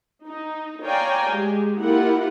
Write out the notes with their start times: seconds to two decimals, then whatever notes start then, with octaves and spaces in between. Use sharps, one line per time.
0.27 D#4
0.85 C#5 D5 F5 G5 G#5 A#5
1.31 G#3 G4
1.81 A#3 E4 F4 G4 A#4 F#5